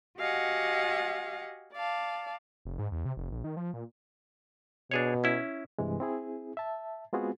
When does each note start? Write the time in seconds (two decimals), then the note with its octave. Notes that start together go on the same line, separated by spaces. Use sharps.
0.18 F#4 G4 D#5 F5 F#5 G#5
1.73 D5 F5 A5
2.65 F1
2.79 G#2
2.92 E2
3.05 C3
3.17 F1
3.32 A#1
3.44 D#3
3.57 F3
3.74 A#2
4.91 B2 D4 G#4 C#5
5.24 C#4 E4
5.79 G2 C3 E3 G#3
6.00 C4 E4 G#4
6.57 E5 A5
7.13 G#3 B3 C4 F4 F#4 G#4